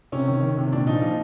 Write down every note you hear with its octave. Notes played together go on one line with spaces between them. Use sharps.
C3 C#4
D#3
D#3
C3
A#2 D4
F3 D#4
F3